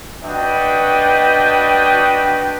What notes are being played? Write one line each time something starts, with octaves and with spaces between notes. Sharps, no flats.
D4 F#4 B4 D#5 G5